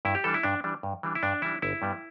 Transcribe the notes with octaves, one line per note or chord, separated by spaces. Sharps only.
G2 E4
G4
E3 G3 D4 A4
E4
G2 D4
E3 G3 D4
G2
E3 G3 D4
E4
G2 D4
E3 G3 D4 E4
G1 E4
G2 G3 B3